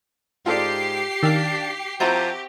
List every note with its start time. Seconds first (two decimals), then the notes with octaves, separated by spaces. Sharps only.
0.46 G#2 F4 G4 A4 D5 C7
1.23 D#3 D4 F5 G5 E6
2.00 F3 C4 E4 F#4 G4 A#5 G6